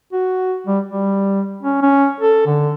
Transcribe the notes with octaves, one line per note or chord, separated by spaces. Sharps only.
F#4
G3
G3
C#4
C#4
A4
D3